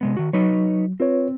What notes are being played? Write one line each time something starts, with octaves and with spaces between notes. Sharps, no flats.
C3 G#3 B3
D#3 F#4
F#3 D#4 B4 C#5
C4 F4 B4 C#5